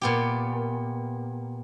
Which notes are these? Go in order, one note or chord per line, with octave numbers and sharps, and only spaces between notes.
A#2 B3 G4